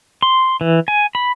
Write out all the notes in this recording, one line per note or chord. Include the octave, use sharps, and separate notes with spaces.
C6
E3
G#5
B5